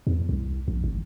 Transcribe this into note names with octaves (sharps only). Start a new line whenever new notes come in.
E2
C2
A#1
G#1